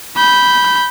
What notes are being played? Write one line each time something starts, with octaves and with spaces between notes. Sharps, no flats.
B5 G6